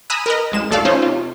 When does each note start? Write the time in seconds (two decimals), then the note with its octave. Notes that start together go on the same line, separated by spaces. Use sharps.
0.10 G#5 A#5 B5 D#6 E6 F#6
0.26 A#4 B4 D#5
0.52 A1 G#3 E7
0.70 B1 E2 A3 A4 D5 F5
0.85 C#4 D#4 F4 A4 C5 C#5
1.02 C3 F4